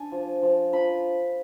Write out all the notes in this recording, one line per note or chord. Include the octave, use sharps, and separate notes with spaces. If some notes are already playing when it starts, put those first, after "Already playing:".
Already playing: D4 G#5
F3
F3
F3 B5